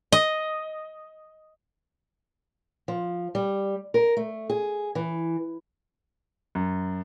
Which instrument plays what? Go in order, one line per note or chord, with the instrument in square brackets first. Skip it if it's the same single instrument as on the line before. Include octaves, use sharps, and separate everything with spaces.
[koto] D#5
[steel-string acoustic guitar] F3
G3
A#4
A3
G#4
E3
[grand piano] F#2